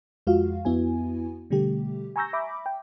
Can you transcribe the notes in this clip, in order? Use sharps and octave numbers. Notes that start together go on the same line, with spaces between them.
F2 G#3 F4 F#4 F5
F2 B3 E4 F#4 G#5
B2 D3 G3 A3 G4
G#5 A#5 C#6 E6 G6 A#6
E5 B5 D6
G5